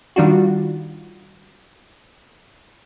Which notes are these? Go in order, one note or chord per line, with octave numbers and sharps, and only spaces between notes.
D#3 G3 D4 F4 F#4